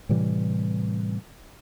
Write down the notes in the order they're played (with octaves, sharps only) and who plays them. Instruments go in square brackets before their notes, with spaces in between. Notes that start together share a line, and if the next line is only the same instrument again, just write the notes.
[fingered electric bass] A2 C3 E3 G3